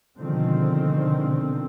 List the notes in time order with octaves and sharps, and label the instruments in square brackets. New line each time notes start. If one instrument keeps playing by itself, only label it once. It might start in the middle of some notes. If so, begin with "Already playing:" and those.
[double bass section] B2 D3 D#3 F3 G#3 C4